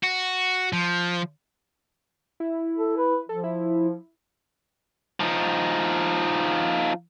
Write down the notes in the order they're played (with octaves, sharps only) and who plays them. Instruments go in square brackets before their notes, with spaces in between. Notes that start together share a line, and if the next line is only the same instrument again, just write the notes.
[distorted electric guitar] F#4
F3
[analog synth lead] E4
[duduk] A4
B4
[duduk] F3 [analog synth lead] A4
[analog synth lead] E4
[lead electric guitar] F3 D#4